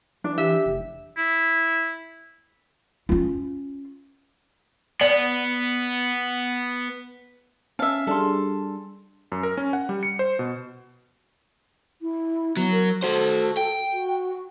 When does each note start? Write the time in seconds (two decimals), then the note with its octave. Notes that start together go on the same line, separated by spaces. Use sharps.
0.24 E3 D4
0.38 G4 E5
0.66 F1
1.18 E4
3.09 C#4 F4
5.01 B3 D5
7.79 C#4 E5 F5 G#5 A5
8.07 G3 D4 G#4 A4 C6
9.32 F#2
9.43 A#4
9.57 C#4
9.73 F#5
9.89 G3
10.03 C#7
10.19 C5
10.39 B2
12.02 E4
12.57 F#3 B3
12.71 A#4
13.03 F#4 A4 C5
13.57 G5
13.93 F#4